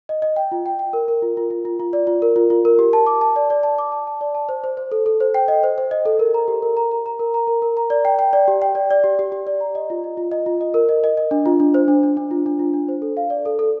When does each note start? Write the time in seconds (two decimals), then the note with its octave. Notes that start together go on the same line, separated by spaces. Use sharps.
0.09 D#5
0.22 D#5
0.36 G5
0.52 F4
0.66 G5
0.79 G5
0.93 A#4
1.08 A#4
1.22 F4
1.37 F4
1.50 F4
1.65 F4
1.80 F4
1.93 D5
2.07 F4
2.22 A#4
2.36 F4
2.50 F4
2.65 A#4
2.79 G4
2.93 A5
3.07 D6
3.21 A5
3.36 D5
3.50 D5
3.63 A5
3.78 D6
3.92 A5
4.07 A5
4.21 D5
4.35 A5
4.49 C5
4.64 C5
4.77 C5
4.92 A4
5.06 A4
5.20 C5
5.34 G5
5.48 D#5
5.63 C5
5.78 C5
5.91 D#5
6.06 A4
6.19 A#4
6.34 A#5
6.48 G4
6.62 A#4
6.77 A#5
6.91 A#5
7.06 A#5
7.19 A#4
7.34 A#5
7.47 A#4
7.62 A#4
7.77 A#5
7.90 D5
8.05 G5
8.19 G5
8.33 D5
8.48 G4
8.62 G5
8.75 D5
8.91 D5
9.04 G4
9.19 G4
9.32 G4
9.47 D5
9.61 A#5
9.75 D#5
9.90 F4
10.04 D#5
10.17 F4
10.32 D#5
10.46 F4
10.61 D#5
10.74 A#4
10.89 D#5
11.04 D#5
11.17 D#5
11.31 D4
11.46 F4
11.60 D4
11.74 C5
11.88 D4
12.03 D4
12.17 D4
12.31 F4
12.46 D4
12.59 F4
12.74 D4
12.88 C5
13.02 A4
13.17 F5
13.30 D5
13.45 A4
13.59 A4